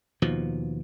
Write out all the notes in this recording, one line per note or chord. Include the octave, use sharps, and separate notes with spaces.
D#2 B2 F3